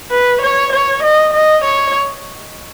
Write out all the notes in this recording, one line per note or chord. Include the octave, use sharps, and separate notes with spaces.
B4
C#5
C#5
D#5
D#5
C#5